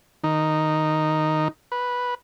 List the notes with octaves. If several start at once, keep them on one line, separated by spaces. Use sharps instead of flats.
D#3 D#4
B4